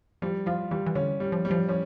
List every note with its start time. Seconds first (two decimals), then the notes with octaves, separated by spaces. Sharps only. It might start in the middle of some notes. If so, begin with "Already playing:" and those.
0.22 F3 G3
0.46 F3 F4
0.71 E3 G3
0.86 E3
0.95 D3 C#4
1.20 G3
1.32 F3
1.45 G3
1.51 F3
1.68 F3 C#4